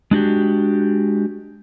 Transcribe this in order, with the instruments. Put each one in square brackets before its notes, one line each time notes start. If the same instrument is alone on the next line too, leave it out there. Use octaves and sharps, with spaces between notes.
[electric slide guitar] G#3 D4 F#4 G4